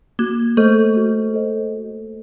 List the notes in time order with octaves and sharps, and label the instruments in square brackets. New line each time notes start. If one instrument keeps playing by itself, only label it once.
[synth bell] A#3 [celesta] F#4
[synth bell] A3 [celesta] A4 C5 D#5
[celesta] F#4
A4 C5 D#5
A4